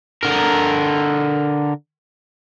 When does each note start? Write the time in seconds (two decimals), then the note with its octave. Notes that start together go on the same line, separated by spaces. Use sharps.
0.23 D3 A#4